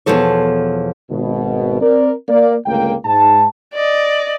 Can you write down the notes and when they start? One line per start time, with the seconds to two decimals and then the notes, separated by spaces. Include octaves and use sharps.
0.06 E2 G2 B2 F3 A4 C#5
1.09 G#1 B2
1.81 C4 A#4 D5
2.28 A#3 D5
2.66 G1 C#2 A3 A#3 G5
3.05 G#2 A5
3.74 D5 D#5